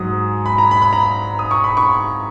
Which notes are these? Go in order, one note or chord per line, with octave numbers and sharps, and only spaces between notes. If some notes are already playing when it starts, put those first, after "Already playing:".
Already playing: G#2 F#3 D#6
B5
A#5
B5
B5
A#5
D#6
C#6
B5
C#6